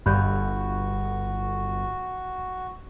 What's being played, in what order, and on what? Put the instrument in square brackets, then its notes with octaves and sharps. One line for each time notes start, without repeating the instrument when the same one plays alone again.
[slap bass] G1 [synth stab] G2 [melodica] F#4 [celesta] B5 F#6 G6